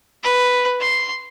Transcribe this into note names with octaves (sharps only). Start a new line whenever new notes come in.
B4
C6